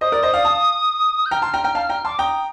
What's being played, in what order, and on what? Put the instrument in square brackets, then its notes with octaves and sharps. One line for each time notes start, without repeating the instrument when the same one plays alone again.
[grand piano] C5 D#5 [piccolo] D#6
[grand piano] A#4 D5
C5 D#5
D5 F5
F5 A5
[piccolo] G6
[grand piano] G5 A#5 [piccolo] F6
[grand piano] A5 C6
G5 A#5
G5 A#5
F5 A5
G5 A#5
[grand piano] A5 C6 [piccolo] D6
[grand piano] G5 A#5 [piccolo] D#6